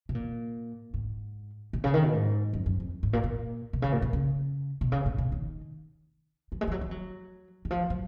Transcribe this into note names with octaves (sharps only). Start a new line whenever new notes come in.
B2
A#2
G#2
A#2
C#3
D#3
B2
G#2
F#2
F#2
F2
G#2
A#2
A#2
B2
C#3
A#2
A#2
C#3
B2
C#3
A#2
B2
D#3
F#3
G#3
F3
F#3
G#3
F#3
D#3
F3
F#3